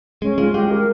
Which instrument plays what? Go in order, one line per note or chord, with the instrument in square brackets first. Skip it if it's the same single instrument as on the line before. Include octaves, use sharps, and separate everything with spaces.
[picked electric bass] G#3 [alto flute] C#4
[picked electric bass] G#3 [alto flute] F4
[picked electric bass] G#3 [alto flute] G4
[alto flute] A#4